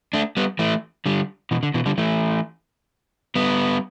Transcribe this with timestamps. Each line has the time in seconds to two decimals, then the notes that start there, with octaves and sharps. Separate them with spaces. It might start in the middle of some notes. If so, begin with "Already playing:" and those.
0.13 A3 D4
0.37 G3 B3
0.59 E3 A3
1.06 D3 G3
1.51 B2 E3
1.63 D3
1.74 B2 E3
1.86 D3 G3
1.98 E3 A3
3.36 G3 B3